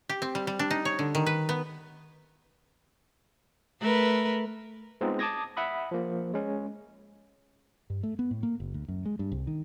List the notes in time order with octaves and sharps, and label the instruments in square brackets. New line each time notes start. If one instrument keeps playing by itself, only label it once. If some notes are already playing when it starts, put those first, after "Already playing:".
[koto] G4
C4
G3
G3
D4
D#4
C#5
D3
D#3
B4
B3
[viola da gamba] A3 A#4 B4
[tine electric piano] G#3 B3 C4 D#4 F4 G#4
A5 D6 D#6 G#6 A#6
E5 F#5 B5 D#6
F3 A#3
G#3 C#4
[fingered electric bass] G2
A3
B3
A2
A#3
F#1
D2
F#2
G#3
G2
C2
D#3